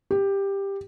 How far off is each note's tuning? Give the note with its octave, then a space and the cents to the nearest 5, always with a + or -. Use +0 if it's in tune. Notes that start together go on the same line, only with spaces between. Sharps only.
G4 +10